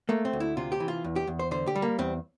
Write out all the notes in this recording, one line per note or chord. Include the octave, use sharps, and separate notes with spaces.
A3 A#3
C4
D2
E4
C3 F4
G4
E3
F4
E2
G4
E2
C5
D3 C5
G4
G3
A#3
E2 C4